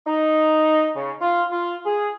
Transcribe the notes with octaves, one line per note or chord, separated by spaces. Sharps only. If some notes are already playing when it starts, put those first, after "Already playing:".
D#4
C#3
F4
F4
G#4